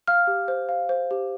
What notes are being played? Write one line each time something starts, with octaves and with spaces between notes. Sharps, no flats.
F5 F6
G4
C5
F5
C5
G4